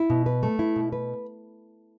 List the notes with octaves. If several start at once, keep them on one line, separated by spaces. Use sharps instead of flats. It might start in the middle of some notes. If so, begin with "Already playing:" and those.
Already playing: E4
B2
B4
A3
E4
B2
B4